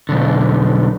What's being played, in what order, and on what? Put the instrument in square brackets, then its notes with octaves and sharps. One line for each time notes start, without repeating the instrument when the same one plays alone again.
[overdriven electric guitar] B1 D3